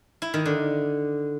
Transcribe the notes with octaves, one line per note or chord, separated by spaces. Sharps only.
E4
D#3
D3